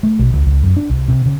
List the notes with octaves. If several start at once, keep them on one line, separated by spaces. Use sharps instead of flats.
A3
B1
C#2
C#2
F#2
D4
C2
C3
C#3